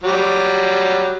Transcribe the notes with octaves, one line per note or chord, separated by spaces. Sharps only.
F#3 G3